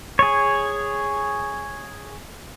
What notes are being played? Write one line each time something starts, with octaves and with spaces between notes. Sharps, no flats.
G#4 C#5